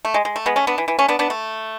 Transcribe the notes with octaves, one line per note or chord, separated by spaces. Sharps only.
A3
G#3
G#3
A3
G#3 B3
A3 C#4
B3 D4
E3
E3
A3 C#4
B3 D4
B3 D4
A3